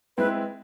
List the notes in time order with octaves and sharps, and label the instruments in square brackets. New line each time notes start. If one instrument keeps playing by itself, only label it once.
[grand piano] G#3 C4 E4 [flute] B4